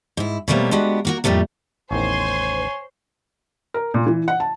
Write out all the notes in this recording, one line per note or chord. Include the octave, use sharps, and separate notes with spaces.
G#2 E4
B2 F#3 G3 A3 A#3 C4
G#3 B3 D4 F#4 G4
A#3 F#4 A#4
F2 A2 G3 A3 A#3
A1 E2 D#3 C5 C#5 G#5 C6
A#4
A#2
E3
F#5
A5